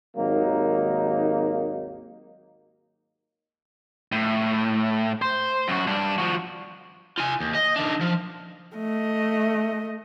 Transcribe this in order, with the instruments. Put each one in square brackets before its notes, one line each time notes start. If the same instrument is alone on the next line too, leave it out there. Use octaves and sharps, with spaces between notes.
[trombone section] G#1 D#2 F#3 A#3 D#4
[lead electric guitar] A2
C5
F#2 F#4
G2 D4
F3 F#4
[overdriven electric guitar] F4 G#5
D#2
D#5
D#3 D4
F3
[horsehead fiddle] A3 D#5